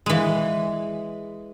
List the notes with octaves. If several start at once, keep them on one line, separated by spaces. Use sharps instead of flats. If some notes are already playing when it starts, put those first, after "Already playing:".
E3 G#3